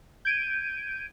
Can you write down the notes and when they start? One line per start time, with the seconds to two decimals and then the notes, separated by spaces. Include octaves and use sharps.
0.25 G6 G#6 D7 D#7